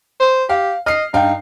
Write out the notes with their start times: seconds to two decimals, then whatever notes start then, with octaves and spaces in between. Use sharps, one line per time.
0.20 C5
0.49 G4 F5
0.86 D#5 F6 C7
1.14 G2 D#4 F5 G5